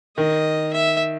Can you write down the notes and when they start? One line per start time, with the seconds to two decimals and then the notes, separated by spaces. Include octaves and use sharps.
0.17 D#3 D#5
0.74 E5